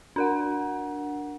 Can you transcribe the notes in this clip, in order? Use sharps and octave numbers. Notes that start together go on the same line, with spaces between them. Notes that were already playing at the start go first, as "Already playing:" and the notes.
D4 A#4 F#5